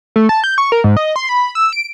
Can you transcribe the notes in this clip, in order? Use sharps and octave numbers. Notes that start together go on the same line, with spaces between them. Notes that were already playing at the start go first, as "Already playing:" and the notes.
A3
A5
G6
C#6
A#4
G#2
D#5
C6
B5
E6
D7